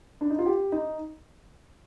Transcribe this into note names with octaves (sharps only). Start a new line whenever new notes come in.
D4
D#4
F4
G4
D#4